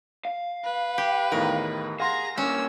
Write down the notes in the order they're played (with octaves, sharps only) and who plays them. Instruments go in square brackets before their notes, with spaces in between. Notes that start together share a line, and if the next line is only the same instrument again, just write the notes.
[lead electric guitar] F5
[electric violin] B4
[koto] G4
[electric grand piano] E2 A2 D#3 [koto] A#4
[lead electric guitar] G#4 [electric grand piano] F5 F#5 C6 [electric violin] A#5 A#6
[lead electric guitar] G2 A#3 [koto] C#4 [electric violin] E6